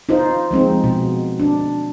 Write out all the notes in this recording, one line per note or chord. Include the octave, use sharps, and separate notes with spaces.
D#4 F4 C5
F3 G#3 C4 D#4
B2
D4